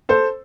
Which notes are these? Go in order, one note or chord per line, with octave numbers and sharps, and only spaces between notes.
A4 C5